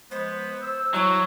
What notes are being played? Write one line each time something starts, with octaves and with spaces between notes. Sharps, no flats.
F3 G#3 B3 C5
E6
F#3 E4